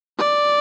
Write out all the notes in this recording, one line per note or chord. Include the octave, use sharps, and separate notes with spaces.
D5